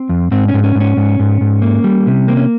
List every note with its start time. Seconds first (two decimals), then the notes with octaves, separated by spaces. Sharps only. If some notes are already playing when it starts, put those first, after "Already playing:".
Already playing: C4
0.09 F2
0.31 G#2 C4
0.48 C#4
0.54 G#2
0.64 C#4
0.75 G#2
0.80 C#4
0.97 G#2
1.19 G#2
1.41 G#2
1.62 A#3
1.84 G3
2.07 C3
2.28 A#3 C4
2.37 C#4